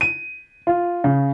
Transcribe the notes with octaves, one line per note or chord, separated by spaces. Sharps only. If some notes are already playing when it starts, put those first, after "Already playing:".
D#7
F4
C#3